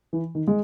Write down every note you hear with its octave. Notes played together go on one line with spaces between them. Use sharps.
E3
D#3
G#3